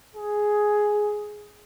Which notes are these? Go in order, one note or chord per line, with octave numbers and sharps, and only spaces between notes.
G#4